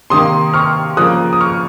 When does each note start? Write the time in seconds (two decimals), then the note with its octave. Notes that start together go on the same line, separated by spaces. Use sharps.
0.10 C3 D#3 A#3 C6 D#6
0.54 C#6 F6
0.97 C#3 F3 A#3 D#6 F#6
1.33 D#6
1.41 C#6 F6